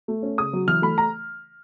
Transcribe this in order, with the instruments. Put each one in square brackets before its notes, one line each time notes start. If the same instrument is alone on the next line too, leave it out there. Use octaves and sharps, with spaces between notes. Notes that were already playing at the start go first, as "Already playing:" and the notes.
[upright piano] A3
C#4
C#3 D#6
F#3
E3 F6
A3 B5
A#5